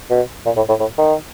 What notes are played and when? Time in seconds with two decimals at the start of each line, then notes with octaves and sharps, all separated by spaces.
0.10 B2
0.46 A#2
0.57 A2
0.69 A2
0.80 A2
0.98 D#3